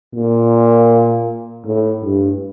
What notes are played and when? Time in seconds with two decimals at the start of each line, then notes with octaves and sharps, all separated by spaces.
0.14 A#2
1.65 A2
2.03 G2